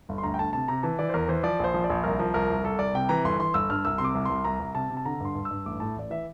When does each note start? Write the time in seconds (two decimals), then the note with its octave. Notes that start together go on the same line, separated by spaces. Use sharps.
0.09 G1
0.18 C6
0.23 D2 A#5
0.34 G5
0.39 D2 A5
0.53 C3 A5
0.68 C3 A#5
0.83 E3 A5
0.99 E3 D5
1.09 C5
1.14 E2 A#4
1.28 E3 C5
1.43 F3 D5
1.60 A#1 C5
1.74 F3
1.84 D5
1.90 A#1
2.04 C2 A#4
2.19 F3
2.34 C2 A#4
2.50 C2
2.64 C2 A4
2.79 C2 D5
2.94 C3 G5
3.09 E3 A#5
3.24 G1 C6
3.39 E3 C6
3.54 G1 E6
3.70 G2 F6
3.85 C2 E6
3.98 C3 C6
4.04 D6
4.15 C2
4.25 C2 C6
4.44 C2 A#5
4.60 C2
4.75 C3 A5
4.90 C3
4.97 A5
5.05 D3 A#5
5.20 G2 C6
5.35 G2
5.45 E6
5.51 G2
5.66 A1 D6
5.80 A2 A5
5.96 A1 D5
6.10 E3 E5